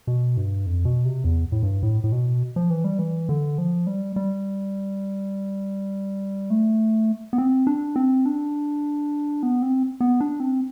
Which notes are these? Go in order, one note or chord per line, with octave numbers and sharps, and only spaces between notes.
B2
G2
F2
B2
C3
E2
A2
G2
A2
A2
B2
F3
E3
G3
E3
D3
F3
G3
G3
A3
B3
C4
D4
C4
D4
B3
C4
B3
D4
C4